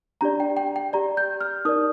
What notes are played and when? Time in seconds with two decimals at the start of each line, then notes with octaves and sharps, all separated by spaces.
0.21 D4 G4 D5 A#5
0.40 G5
0.57 G5
0.76 G5
0.93 G4 D5 A#5
1.17 G6
1.41 F6
1.65 D#4 A#4 D5 D#6